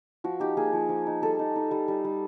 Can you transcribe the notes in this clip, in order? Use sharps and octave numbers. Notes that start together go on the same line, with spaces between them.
F3 F#4
D#4 G4
A#3 G#4
F3
F3
D#4
G3 A4
D#4
D#4
G3
G3
G3